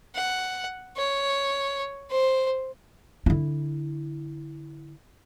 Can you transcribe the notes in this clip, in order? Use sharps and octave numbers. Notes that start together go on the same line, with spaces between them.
F#5
C#5
C5
D3 E4